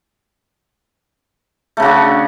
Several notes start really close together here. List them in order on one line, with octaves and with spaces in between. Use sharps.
A3 C#3 F#4 D4